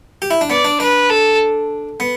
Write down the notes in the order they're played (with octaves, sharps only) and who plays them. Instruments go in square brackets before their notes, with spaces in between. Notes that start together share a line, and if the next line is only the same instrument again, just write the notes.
[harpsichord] G4
E4
D4
[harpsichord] B3 [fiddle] D5
[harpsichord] D4
[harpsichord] D4 [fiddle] B4
[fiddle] A4
[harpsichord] B3